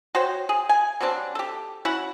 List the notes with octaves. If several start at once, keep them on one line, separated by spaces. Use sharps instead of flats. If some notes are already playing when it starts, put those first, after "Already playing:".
F#4 C5 C#5 G5
G#4
G#5
F#3 G3 C4 D4
G4 A4
C#4 E4 F#4 F#5